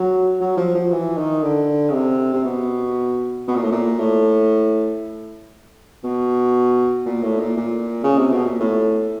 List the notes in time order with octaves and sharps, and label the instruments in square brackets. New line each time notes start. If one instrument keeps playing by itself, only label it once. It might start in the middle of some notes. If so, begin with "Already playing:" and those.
Already playing: [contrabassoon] F#3
F#3
F3
F3
E3
D#3
D3
C#3
C3
C3
B2
B2
A#2
A2
A#2
A2
B2
A#2
A2
A#2
A#2
C#3
C3
B2
A#2
A2